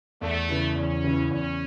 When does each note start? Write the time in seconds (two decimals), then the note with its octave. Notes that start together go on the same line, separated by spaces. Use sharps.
0.21 E2 A3
0.49 C#3 E3
0.76 E2 C#4
1.04 C#3 E3
1.31 E2 C#4